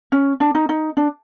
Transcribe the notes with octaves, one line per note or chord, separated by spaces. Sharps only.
C#4
D4
D#4
D#4
D4